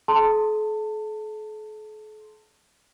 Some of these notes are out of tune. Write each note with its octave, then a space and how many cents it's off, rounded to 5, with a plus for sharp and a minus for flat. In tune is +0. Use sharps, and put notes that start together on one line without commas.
A4 -45 A5 +25 C6 +0